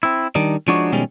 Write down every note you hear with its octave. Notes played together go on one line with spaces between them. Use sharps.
C4 E4
D#3 G3 D4 D#4
F3 G#3 D4 D#4 F#4 C#5
B2 D#3 F3 G3 G#3 C#4